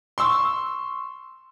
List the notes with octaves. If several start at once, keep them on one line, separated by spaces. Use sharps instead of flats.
C6 C#6 E6